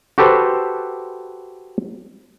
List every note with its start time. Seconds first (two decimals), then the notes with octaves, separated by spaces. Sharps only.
0.18 F#4 G4 A4 B4 C5